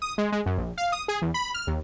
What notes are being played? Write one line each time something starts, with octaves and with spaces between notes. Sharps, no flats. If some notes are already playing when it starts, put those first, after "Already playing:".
D#6
G#3
G#3
F#2
A#1
F5
D#6
G#4
E2
B5
F6
D#2